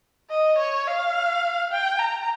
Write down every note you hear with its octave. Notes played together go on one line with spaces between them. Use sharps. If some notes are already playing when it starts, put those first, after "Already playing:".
D#5
C#5
F5
G5
A#5